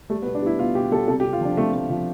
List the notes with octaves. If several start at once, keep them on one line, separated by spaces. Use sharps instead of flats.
G3 A3
B3
B2
D4
G3 E4
B2 F4
B2 G4
G3 A4
C3 A4
G4
C3
F4
F3 D4
C3 A3
A3
F3